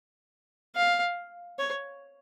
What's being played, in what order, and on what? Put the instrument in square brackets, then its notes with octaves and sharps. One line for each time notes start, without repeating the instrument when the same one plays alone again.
[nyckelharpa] F5
C#5